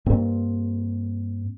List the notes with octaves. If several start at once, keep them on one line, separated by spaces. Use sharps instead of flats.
G2 A#3 C4